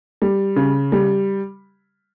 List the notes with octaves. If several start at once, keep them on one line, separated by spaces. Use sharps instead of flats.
G3
C#3
G3